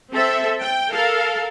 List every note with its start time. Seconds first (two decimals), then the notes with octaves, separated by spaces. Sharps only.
0.12 C4 A4 E5
0.60 G5
0.92 A4 A#4 F5